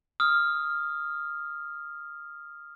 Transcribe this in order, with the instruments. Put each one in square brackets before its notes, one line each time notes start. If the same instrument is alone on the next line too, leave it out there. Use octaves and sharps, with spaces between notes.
[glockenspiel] D#6 F6